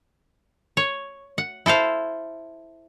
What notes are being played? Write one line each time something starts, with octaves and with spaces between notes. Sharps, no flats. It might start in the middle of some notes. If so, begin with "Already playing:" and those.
C#5
F#5
E4 A4 C5 F5